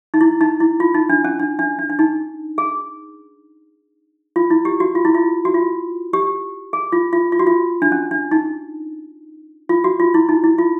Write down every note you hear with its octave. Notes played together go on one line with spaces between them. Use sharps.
D#4
E4
D#4
E4
F4
D#4
D4
C#4
D4
D4
D4
D4
D#4
G#4
F4
E4
G4
F#4
F4
E4
F4
F#4
F4
G4
G#4
F4
F4
F4
F#4
F4
D4
C#4
D4
D#4
F4
F#4
F4
E4
D#4
E4
F4